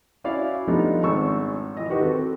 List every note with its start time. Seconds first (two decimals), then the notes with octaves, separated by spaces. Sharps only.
0.24 C#4 E4 F#4 D5 F5
0.67 F3 G3 A3 B3 D4 D#4
1.03 G#1 C#6 E6
1.77 E3 D#5
1.90 D#3 F#4 G4 B4
2.01 C4 A4